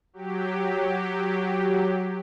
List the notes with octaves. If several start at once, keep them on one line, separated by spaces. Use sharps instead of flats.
F#3 G4